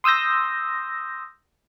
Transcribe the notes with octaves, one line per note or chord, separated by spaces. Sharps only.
C6 D#6 E6 G6 A#6